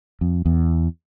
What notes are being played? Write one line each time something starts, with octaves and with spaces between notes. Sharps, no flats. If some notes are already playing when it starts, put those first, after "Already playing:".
F2
E2